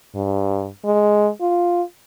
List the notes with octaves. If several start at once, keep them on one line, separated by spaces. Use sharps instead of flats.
G2
G#3
F4